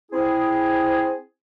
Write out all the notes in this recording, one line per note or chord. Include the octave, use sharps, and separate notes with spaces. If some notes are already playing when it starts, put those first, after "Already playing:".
C4 E4 G#4